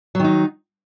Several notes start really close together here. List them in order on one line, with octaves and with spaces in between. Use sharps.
F#3 D#3 D#4